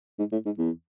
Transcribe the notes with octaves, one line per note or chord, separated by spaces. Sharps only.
G#2
A2
G#2
E2